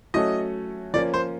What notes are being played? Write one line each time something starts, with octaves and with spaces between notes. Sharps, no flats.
F#3 A3 C#4 F#4 A4 D#5
F3 A#3 C#4 D5
C5